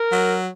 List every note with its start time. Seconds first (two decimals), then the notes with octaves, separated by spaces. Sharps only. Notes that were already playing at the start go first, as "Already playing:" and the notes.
Already playing: A#4
0.12 F#3